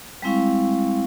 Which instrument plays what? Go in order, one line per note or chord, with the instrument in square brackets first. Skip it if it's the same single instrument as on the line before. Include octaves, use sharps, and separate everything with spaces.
[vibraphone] G3 G#3 C4 E4 F5 C#6